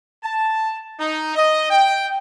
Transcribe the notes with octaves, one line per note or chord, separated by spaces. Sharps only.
A5
D#4
D#5
G5